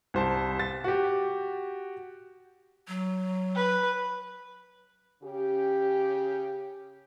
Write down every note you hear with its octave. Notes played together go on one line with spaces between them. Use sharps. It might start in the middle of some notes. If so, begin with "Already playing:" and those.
C2 C5 A5
A6
F#4 G4
F#3
B4
C#3 C#4 G4